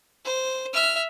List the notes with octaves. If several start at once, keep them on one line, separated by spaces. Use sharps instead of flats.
C5
E5 F6